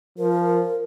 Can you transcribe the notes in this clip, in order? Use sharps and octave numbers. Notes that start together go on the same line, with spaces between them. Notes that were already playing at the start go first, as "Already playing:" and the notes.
F3 A#4